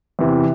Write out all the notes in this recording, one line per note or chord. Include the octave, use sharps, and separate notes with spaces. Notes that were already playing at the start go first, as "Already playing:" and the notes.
E2 C3 E3